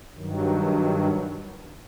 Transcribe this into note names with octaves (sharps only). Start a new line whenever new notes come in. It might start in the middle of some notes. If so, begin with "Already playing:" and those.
G2 D#3 F#3